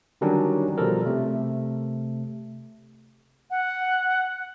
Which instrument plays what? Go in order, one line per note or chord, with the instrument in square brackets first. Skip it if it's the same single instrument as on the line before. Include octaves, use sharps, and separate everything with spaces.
[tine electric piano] D3 D#3 F#3 G3 C#4 D4
B2 F3 G3 A4 A#4
C3 A3
[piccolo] F#5